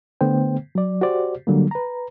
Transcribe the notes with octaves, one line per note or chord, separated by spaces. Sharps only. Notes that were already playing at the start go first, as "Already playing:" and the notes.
D3 A3 B3 C5 G5
F#3 D5
F#4 G4 C5 D5
D3 F#3 G3 A#3
B4 A#5